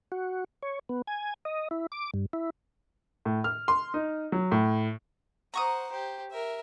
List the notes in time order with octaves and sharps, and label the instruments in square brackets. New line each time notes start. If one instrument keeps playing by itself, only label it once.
[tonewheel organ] F#4
C#5
B3
G#5
D#5
E4
D6
G2
E4
[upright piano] A2
F6
C6
D#4
F#3
A2
[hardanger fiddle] C5 F#5 [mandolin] A#5 C#6 D#6
[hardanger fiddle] G4 C5
A#4 E5